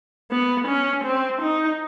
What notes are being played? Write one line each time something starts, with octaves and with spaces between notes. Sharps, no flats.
B3
C#4
C4
D#4